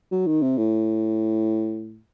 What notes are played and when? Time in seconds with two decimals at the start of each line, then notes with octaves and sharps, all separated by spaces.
0.12 F#3
0.27 D#3
0.42 C3
0.58 A2